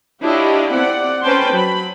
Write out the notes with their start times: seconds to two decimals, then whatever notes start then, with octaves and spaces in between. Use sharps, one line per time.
0.22 D4 E4 F4 G4 C#5 D#5
0.73 C4 D5 F#5
1.23 C#4 B4 C5 G5 A5 C6
1.52 F#3 B5